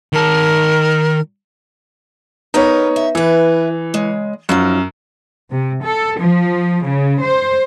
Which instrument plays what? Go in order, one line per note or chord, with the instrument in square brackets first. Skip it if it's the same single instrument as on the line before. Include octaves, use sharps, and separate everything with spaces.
[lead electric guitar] D#3 A5 [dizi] A#4
[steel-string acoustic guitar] B3 A#4 B4 [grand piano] D#4 C#5
[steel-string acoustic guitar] E5
[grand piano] E3 [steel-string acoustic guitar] E4 B4
[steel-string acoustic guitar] C#3 G#3
[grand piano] F#2 [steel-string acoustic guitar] F3 F#3 D#4
[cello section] C3
A4
F3
C#3
C5